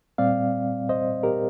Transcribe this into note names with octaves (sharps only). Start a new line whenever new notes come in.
A#2 G3 C4 D5 F5
C5 D#5
G4 A#4